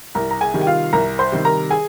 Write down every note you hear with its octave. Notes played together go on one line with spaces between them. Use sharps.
C2 A#4 A#5
A#5
G#4 G#5
C3 D#3 G3
G5
F4 F5
C2 A#4 A#5
C5 C6
C3 D#3 G3
A#4 A#5
G#4 G#5